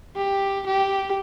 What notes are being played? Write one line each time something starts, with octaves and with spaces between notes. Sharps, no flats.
G4
G4